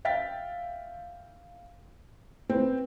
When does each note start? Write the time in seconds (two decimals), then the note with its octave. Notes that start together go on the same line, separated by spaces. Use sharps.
0.05 E5 F5 G5 A6 B6
2.50 C4 B4